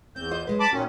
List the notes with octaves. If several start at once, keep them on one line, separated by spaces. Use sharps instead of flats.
E2 C4 G6
F4 C5 D#5
F#3 G#3 B4
A5 B5 D6
A#2 D#3 C#4 F#4